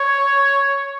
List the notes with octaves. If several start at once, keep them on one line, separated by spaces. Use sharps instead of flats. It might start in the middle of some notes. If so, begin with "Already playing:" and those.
Already playing: C#5